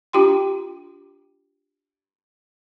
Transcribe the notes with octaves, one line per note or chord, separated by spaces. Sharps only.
D4 F4 G4 G5 C6